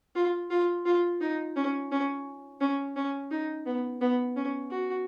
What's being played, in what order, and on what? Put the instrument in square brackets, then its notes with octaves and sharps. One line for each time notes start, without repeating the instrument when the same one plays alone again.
[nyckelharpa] F4
F4
F4
D#4
C#4
C#4
C#4
C#4
D#4
B3
B3
C#4
F#4